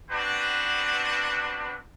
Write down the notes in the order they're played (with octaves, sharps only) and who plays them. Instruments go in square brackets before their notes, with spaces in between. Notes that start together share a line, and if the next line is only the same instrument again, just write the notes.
[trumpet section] B3 C4 D4 F#4 B4